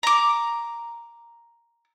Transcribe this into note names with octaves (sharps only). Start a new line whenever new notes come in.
A#5 D6